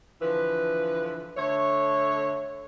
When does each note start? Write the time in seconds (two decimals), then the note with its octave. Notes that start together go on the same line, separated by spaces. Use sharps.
0.21 D3 E3 F3 B4
1.37 D3 A3 C#5